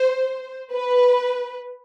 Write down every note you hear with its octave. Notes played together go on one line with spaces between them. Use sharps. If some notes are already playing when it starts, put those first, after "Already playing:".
Already playing: C5
B4